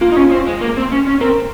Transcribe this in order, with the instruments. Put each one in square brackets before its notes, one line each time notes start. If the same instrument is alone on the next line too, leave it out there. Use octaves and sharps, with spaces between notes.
[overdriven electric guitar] A#3 [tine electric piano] F4
[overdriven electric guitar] D#4
C#4
C4
G#3
A#3
C4
C#4
C#4
[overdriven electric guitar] C4 [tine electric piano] A#4